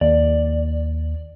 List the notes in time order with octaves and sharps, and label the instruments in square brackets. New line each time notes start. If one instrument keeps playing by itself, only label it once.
[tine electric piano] D#2 [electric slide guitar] D5